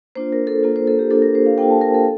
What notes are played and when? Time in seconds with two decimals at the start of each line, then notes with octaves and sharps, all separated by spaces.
0.16 A#3 D4 F4 C5
0.32 A#4
0.47 A4
0.63 A#3 D4 F4 A4
0.76 C5
0.87 A4
0.99 G4
1.11 A#3 D4 F4 A4
1.22 A#4
1.35 C5
1.46 F5
1.58 A#3 D4 F4 G5
1.70 A5
1.81 A#4
1.94 A4